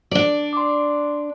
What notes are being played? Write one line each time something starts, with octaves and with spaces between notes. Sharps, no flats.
D4 D5
C6 D6